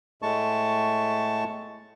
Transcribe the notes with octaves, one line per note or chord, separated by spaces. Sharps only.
A2 G#3 A3 A5 C#6